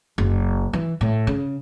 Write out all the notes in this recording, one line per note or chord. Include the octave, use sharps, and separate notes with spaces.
F#1
E3
A2
C#3